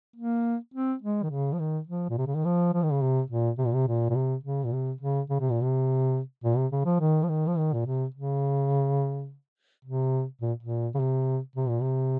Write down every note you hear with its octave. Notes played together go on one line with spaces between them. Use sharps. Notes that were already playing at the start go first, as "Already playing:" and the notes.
A#3
C4
G#3
D#3
C#3
F3
D#3
F3
A#2
C3
C#3
D#3
F3
F3
D#3
C#3
C3
A#2
C3
A#2
C3
A#2
A#2
C3
C#3
A#2
C3
C#3
C#3
C3
A#2
C3
A#2
C3
C#3
F3
D#3
F3
D#3
F3
D#3
A#2
C3
C#3
C3
A#2
A#2
C#3
C3
C3
A#2
C3